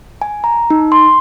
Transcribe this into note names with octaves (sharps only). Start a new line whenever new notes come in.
G#5
A#5
D#4
C6